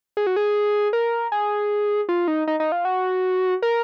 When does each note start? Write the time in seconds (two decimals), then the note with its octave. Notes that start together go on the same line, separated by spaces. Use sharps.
0.17 G#4
0.27 F#4
0.36 G#4
0.93 A#4
1.32 G#4
2.09 F4
2.28 D#4
2.47 D#4
2.60 D#4
2.72 F4
2.85 F#4
3.62 A#4